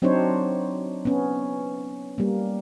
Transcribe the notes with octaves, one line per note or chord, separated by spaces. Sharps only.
F#3 C4 D4 D#4 C5 C#5
B3 C#4
G3 A#3